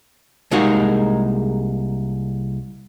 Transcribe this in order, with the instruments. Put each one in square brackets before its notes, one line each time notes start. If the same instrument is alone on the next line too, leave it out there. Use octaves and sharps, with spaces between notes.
[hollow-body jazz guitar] C2 G#3 A#3 D#4 F#4 G#4